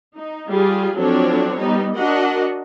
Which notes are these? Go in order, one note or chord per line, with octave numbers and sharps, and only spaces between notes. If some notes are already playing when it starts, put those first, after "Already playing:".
D#4
G3 F4 G#4
F3 F#3 C4 D4 A4 C#5
G3 B3 D#4
D4 F#4 A#4 D#5 F#5